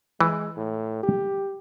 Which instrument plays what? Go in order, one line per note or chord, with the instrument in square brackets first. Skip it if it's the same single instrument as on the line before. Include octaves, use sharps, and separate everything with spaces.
[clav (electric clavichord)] E3 [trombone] G#3
[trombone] A2
G4